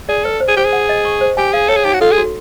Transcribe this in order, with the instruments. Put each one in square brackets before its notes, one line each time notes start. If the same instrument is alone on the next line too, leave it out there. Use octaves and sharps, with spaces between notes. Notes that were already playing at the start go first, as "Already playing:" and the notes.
[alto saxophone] G#4 [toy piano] D5
[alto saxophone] A4 [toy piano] B4
[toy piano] C5
[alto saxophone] G#4
[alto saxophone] G4 [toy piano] C5
[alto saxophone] G#4
[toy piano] F#5
D#5
C#6
C5
[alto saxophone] G4 [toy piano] G#5
[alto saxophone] G#4 [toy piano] F5
[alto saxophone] A4 [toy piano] C#5
[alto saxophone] G#4
[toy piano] D#4 [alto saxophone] G4
[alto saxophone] F#4
[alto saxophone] F4 [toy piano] A4
[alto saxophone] G#4
[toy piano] F#4